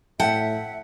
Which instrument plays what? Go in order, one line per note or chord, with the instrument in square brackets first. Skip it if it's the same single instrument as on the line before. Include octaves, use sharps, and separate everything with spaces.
[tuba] A2 [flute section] E5 [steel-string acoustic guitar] F#5 [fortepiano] G5 A5